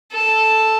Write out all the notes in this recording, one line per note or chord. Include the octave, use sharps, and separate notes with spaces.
A4